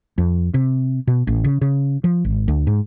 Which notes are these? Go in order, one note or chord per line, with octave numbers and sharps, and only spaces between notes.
F2
C3
B2
A1
C#3
C#3
F3
G#1
D2
G#2